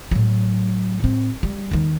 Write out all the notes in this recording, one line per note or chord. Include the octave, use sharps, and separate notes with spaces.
A2 F#3
A2 C4
G3
D#2 D#3